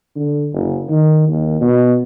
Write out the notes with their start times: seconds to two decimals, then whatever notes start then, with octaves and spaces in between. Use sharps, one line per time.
0.16 D3
0.53 F#1
0.89 D#3
1.28 D#2
1.61 B2